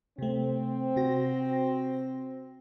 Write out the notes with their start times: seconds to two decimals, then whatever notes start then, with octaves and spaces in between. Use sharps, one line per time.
0.19 C3 A3 C4
0.96 C3 F#4 A#6